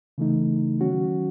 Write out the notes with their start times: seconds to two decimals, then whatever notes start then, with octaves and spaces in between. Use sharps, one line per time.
0.18 C#3 E3 A3 D#4
0.81 D#3 F#3 C#4 F#4